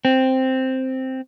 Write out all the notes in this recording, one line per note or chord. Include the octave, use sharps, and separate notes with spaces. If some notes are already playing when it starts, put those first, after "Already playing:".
C4